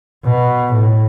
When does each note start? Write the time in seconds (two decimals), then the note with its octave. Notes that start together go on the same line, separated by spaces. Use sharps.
0.24 B2
0.72 A2